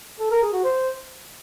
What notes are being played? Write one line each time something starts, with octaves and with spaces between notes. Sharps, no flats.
A4
A#4
G#4
F#4
C5